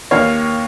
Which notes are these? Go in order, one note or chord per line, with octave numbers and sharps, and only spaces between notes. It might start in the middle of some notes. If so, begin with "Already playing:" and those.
D#2 D#3 A#3 C#5 F5